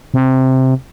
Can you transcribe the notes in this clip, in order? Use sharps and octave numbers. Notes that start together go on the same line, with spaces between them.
C3